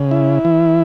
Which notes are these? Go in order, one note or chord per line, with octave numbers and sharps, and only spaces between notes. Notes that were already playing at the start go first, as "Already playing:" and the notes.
Already playing: C#3
E4
E3